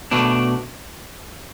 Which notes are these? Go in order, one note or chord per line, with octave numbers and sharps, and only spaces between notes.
B2 A3 D4